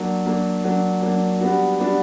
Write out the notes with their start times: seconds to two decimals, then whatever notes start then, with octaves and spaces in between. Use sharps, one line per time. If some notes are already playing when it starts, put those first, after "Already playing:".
Already playing: F#3 A#3 D4
0.26 F#3 A#3 D4
0.64 F#3 A#3 D4
1.02 F#3 A#3 D4
1.41 G3 B3 D4 F#4
1.80 G3 B3 D4 F#4